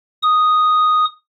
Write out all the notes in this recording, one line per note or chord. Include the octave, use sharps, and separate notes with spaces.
D#6